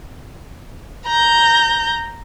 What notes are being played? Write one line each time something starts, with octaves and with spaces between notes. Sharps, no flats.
A#5 G6